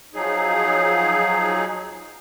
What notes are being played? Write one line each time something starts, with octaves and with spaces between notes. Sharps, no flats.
F3 F#3 D#4 G#4